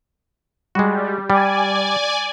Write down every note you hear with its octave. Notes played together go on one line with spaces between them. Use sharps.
G3 G#3 F#4
G3 D5 G#5